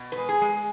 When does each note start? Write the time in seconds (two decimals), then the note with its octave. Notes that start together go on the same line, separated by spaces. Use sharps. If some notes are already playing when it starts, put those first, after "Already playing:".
Already playing: B2
0.12 B4
0.17 G#3
0.29 G#4
0.42 G#3